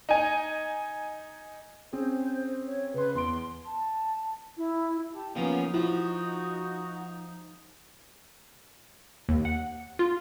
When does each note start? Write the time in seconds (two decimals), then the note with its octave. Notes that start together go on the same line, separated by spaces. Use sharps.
0.09 D#4 G#5
1.93 C4 C#4 G#4 C5
2.66 C#5
2.94 C#3 B4 C6
3.15 E2 C6 D7
3.66 A5
4.57 E4
5.14 G4 A5
5.35 C#3 F3 A#3 B3 C#4 D#4
5.74 F3 E4 F#4
9.29 D#2
9.45 F#5
9.99 F4